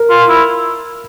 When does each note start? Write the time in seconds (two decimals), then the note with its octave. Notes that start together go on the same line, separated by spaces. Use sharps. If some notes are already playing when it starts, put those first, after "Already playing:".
Already playing: A#4
0.10 F4
0.29 E4